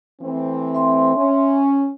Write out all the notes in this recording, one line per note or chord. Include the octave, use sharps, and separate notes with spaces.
E3 A3 C4
E5 C6
C#4